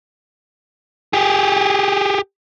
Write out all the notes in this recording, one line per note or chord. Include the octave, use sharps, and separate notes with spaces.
G4 G#4